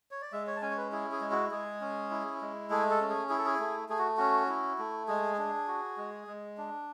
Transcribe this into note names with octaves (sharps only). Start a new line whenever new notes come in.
C#5
D5
G#3 E5
C#5
A5
C#4 G#5
C#5
B4
E4 G#4
G#4
G#3
F#4
G#3 G#4
C#4
E4
G#3
A3 G#4
A4
C#4
G#4
E4 G#4
A4
G#4
A3
A3 G#4
F#4
C#4 F#4
E4
A3
G#3 G#4
D4
F#4
G#3
G#3
D4